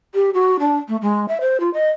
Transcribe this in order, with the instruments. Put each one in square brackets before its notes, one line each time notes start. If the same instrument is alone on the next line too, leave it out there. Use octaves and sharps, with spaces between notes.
[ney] G4
F#4
D4
A3
G#3
E5
C5
F4
D#5